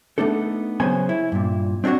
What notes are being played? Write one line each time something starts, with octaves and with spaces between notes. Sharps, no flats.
A3 B3 D4 D#4 A4
C#3 F#3 B3 C5 G#5
E4
G2 A#2
C4 D4 F4 F#4 C#5